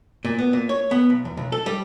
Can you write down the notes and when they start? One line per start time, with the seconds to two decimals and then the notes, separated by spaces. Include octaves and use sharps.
0.25 A#2
0.38 B3
0.53 A#2
0.69 C#5
0.91 B3
1.10 B1
1.25 E2
1.37 B1
1.52 A4
1.66 G3